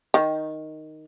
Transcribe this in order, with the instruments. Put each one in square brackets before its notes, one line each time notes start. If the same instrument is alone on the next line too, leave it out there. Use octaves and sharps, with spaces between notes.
[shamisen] D#3